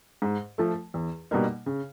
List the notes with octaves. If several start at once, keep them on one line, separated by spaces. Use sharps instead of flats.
G#2
F3 A3
E2
B2 G3 A#3 D#4
C#3